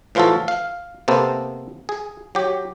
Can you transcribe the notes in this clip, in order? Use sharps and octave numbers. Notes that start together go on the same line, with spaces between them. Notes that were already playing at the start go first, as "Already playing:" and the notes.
A2 E3 F3 F4 F#4 A4
F5
C3 A#3 B3 A4 C5
G#4
F#3 G4